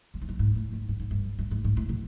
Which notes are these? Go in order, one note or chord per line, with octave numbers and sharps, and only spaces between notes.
G2
G#2
G2
G#2
A2
G#2
G2
G#2
G2
G2
G#2
G#2
A2
B2